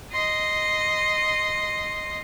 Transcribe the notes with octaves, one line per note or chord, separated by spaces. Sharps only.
D#5 C6